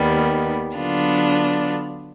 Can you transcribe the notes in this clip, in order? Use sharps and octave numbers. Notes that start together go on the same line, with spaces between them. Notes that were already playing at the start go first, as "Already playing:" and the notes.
Already playing: D#2 D#3 G3 B3
D3 F#3 B3 D4 F4